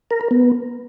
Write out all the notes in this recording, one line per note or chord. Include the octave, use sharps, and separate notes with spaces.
A#4
A#4
B3